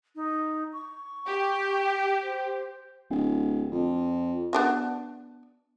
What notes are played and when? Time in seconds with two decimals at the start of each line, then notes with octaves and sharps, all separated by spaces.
0.16 D#4
0.73 C#6
1.26 G4
2.22 C5
3.10 D1
3.72 F2
4.53 B3 D4 F#4